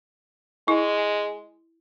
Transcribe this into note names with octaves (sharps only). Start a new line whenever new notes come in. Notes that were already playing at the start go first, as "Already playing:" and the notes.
G#3 E4